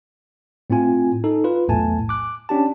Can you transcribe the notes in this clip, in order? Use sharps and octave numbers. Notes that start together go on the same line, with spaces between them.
A2 C4 E4 F4 G#5
D#4 A4
F4 B4
B1 E2 A2 A3 G#5 A5
D6 F#6
C#4 D4 G4 A5